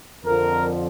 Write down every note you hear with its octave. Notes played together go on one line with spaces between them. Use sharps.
F2 D3 F3 A#4